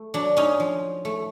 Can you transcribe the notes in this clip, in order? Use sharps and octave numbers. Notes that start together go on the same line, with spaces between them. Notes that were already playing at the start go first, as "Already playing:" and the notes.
Already playing: A3
F#3 D4
C#4 D#4
F3
A3